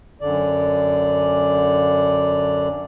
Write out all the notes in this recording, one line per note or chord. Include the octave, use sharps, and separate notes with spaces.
F#2 D3 D5